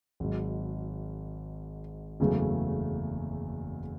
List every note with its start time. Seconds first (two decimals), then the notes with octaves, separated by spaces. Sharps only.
0.20 G#1 G#2 F#3
2.20 F#1 E2 C#3 F#3 A3